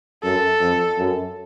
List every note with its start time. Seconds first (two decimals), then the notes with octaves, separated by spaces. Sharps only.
0.23 F#2 A4
0.61 F2
0.98 F#2